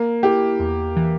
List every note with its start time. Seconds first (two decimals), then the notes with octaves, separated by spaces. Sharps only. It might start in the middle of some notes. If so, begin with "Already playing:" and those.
Already playing: A#3
0.23 E4 G4
0.60 E2
0.96 E3